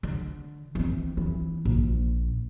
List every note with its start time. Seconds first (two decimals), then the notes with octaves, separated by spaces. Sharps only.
0.03 D3
0.75 E3 C4
1.17 E3
1.65 A#1